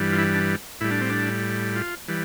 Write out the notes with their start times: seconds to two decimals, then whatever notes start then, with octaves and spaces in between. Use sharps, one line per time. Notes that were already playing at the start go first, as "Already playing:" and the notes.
Already playing: G2 E3 G3
0.12 F4
0.18 E4
0.34 D4
0.81 A2 G3 E4
0.91 D4
1.01 C4
1.10 D4
1.76 F4
2.08 E3 G3